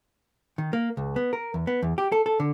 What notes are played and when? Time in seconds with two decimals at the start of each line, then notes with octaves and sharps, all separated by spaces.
0.58 D#3
0.73 A#3
0.97 C#2
1.16 B3
1.33 A#4
1.54 E2
1.67 B3
1.83 E2
1.98 G4
2.12 A4
2.26 A4
2.40 D3